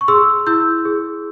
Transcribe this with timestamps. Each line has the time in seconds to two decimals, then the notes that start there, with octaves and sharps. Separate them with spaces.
0.01 C#6
0.08 G#4 C6 E6
0.47 E4 E6 G6
0.85 G#4